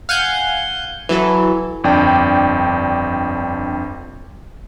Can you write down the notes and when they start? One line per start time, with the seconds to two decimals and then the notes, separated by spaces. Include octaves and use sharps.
0.09 F5 F#5 G#5 G6
1.09 E3 F#3 A4
1.84 G1 F2 D4 D5 G5